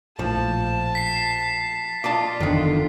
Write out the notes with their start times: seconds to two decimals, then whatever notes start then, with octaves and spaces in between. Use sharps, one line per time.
0.19 A#1 A2 F3 A5
0.95 B6 C7
2.04 F4 D5 D#5 A5
2.40 F#1 E2 D3 D#3